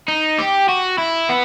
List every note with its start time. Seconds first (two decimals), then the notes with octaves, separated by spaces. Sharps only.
0.08 D#4
0.39 G4
0.69 F#4
0.98 E4
1.29 B3